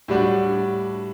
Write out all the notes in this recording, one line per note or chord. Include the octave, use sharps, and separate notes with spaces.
A2 G3 D4 F#4